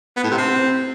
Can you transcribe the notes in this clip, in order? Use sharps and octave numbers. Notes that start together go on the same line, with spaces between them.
B3
A2
C3
C4